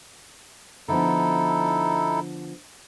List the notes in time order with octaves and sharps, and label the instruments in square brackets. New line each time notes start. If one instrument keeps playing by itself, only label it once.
[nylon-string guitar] D3 F3 B3 [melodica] D#4 E4 A4